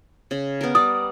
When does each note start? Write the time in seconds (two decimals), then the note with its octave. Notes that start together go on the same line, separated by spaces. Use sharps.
0.31 C#3
0.61 B3 A#4
0.75 G3 D5 D#6